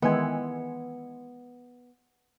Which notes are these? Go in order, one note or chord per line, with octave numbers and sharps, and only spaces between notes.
D#3 E3 G#3 B3